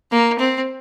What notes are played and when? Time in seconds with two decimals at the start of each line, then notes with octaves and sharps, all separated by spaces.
0.12 A#3
0.39 C4